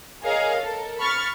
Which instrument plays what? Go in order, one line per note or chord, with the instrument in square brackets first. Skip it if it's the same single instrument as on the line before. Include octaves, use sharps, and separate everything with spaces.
[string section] G#4 A#4 C#5 D#5 F5
A4 A#4
B5 C#6 F6 A6